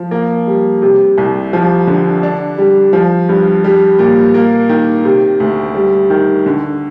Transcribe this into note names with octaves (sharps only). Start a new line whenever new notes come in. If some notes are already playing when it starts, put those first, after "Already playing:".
Already playing: F3
A#3
G3
C3
C2
F3
D3
D4
G3
F3
G2
G3
A#2
A#3
D#3
C3
D2
G3
D#3
D3